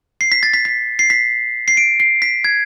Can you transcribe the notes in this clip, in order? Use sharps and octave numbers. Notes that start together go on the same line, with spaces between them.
C7
B6
A6
B6
B6
C7
B6
C7
D7
C7
B6
G#6